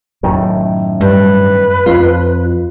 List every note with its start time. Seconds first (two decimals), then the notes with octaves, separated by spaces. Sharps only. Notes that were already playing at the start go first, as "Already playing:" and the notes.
0.23 F#2 A2 D#3
1.01 G2 B4
1.86 F2 F4